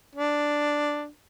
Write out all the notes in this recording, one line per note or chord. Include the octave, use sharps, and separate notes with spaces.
D4